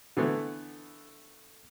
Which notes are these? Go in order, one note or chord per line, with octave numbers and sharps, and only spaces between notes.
D3 E3 A3 B3